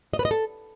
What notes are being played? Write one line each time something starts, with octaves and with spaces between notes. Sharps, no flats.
D#5
B4
D#5
A4